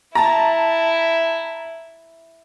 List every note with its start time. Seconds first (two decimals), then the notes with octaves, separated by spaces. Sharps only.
0.15 E4 A5 A#5